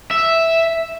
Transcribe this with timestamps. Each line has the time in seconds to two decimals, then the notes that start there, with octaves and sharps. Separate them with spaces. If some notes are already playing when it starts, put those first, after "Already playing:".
0.11 E5